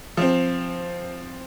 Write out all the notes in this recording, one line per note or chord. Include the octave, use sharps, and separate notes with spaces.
F3 C4